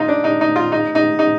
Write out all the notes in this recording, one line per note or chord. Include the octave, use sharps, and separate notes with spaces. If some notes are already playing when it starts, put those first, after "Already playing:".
Already playing: D#4 F4
D4
D#4
D#4
F4
D#4
D#4
D#4